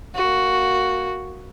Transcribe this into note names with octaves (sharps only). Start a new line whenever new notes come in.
A#3 F#4